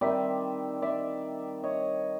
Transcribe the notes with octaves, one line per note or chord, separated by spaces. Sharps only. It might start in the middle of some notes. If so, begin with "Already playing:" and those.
D#3 G3 C4 D#4 D5 E5
D5 E5
C#5 D#5